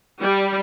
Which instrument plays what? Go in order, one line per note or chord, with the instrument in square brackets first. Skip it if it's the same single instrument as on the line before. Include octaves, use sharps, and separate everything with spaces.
[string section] G3